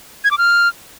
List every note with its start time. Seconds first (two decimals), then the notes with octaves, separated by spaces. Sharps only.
0.24 G#6
0.31 D6
0.38 F6